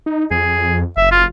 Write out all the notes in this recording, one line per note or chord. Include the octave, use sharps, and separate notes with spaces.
D#4
F2 G#4
F#1 E5
F4